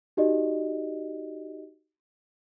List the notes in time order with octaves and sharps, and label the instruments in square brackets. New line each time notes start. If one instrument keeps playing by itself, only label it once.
[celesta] D#4 F#4 G4 D5 D#5